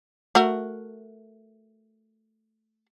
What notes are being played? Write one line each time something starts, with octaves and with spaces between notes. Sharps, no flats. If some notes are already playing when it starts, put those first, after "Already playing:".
A3 F#4 A#4